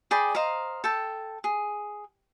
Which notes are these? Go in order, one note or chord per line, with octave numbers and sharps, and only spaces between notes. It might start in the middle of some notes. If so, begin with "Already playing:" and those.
G#4 D5 G5 B5
C5 D#5 F5 A#5
A4 G5 A5
G#4